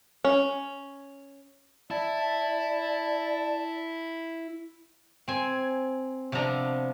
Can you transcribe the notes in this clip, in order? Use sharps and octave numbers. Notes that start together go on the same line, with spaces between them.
C#4
E4 D5 A5
C4 G#5
C3 F3 B3 D4 A#5